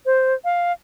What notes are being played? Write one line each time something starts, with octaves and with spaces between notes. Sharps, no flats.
C5
F5